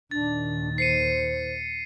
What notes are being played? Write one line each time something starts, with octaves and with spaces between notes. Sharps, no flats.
D#2 A#2 D#3 D4 A6
C5 C7 C#7 D#7